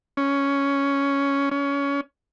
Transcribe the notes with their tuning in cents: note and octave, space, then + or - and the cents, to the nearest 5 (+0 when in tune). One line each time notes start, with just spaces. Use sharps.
C#4 +5
C#4 +20